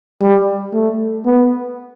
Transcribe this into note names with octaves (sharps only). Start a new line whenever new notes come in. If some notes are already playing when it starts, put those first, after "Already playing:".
G3
A3
B3